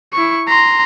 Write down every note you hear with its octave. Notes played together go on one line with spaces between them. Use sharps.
E4 C#6
A#5 C6